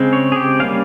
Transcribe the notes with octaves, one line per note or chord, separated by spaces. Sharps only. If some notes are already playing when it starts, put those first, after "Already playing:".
Already playing: C#3 G#3 C4
C#5
G#4
G4
G3 A#3 C#4 F5